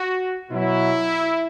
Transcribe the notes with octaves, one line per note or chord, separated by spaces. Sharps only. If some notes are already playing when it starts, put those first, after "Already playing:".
Already playing: F#4
B2 F#3 E4